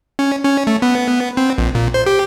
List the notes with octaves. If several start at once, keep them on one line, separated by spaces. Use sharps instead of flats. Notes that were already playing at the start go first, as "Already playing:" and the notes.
C#4
C#4
A3
B3
C4
A#1
A#2
C5
G4